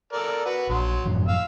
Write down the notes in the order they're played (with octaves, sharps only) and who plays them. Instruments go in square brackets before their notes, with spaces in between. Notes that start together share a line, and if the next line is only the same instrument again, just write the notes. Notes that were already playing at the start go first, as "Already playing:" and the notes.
[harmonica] A4 A#4 D5
F#4 B4
[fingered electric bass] A#1 [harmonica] F#3 C6
[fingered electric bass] F#2 A2 F3
[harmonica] F5 E6